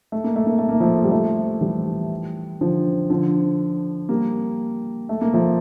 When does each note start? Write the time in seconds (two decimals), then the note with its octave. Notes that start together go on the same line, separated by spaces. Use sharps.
0.12 A3
0.24 A#3
0.36 A3
0.47 A#3
0.59 A3
0.69 A#3
0.80 F3 A3
1.04 G3
1.11 F3 A3
1.61 E3 G3
2.61 D3 F3
3.10 D3 F3
4.09 G3 A#3
5.09 A3
5.21 A#3
5.34 F3 A3